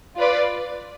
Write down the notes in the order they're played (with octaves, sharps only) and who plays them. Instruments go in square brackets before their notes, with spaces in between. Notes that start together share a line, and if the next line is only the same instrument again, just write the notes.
[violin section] F4 B4 D5